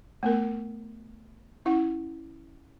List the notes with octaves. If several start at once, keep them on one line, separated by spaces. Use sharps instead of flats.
A3 B3 A#4
C#4 E4 F#5